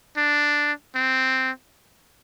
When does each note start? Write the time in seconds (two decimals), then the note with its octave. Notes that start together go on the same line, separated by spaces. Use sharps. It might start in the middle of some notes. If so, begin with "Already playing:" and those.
0.17 D4
0.96 C4